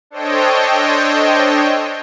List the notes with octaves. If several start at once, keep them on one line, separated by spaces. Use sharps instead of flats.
D4 A4 C5 C#5 D#5 G5